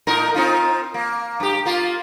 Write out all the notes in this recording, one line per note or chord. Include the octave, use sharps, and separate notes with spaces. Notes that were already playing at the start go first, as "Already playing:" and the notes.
A2 D#4 A#4
C4 D#4 F4
A#3
G2 G4
A#3 F4